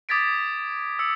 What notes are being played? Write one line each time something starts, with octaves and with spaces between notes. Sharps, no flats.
D6 D#6 G#6 A6 B6 D7
E6 C#7